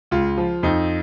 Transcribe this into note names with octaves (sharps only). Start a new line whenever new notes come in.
C#2 F4
F3
F2 D#4